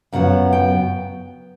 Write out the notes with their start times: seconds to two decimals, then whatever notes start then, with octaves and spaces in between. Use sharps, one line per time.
0.12 F#2 C#3 F#3 B3 F#5
0.53 G5